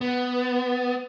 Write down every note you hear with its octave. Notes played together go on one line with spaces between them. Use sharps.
B3